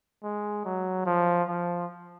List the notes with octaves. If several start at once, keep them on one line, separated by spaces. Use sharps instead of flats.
G#3
F#3
F3
F3